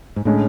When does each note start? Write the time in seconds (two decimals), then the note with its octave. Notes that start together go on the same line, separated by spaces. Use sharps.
0.16 G#2
0.25 A2 D3 G#3 C#4